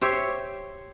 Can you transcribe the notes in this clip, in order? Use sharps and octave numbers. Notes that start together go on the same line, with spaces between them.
G4 C5 C#5 E5